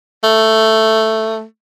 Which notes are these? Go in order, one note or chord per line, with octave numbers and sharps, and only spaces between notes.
A3